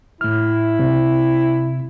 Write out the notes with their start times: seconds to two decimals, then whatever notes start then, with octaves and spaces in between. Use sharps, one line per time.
0.21 A2 E4 F6
0.79 C3